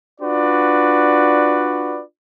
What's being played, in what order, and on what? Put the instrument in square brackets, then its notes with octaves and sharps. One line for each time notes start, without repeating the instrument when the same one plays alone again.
[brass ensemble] D4 F4 F#4 B4 D5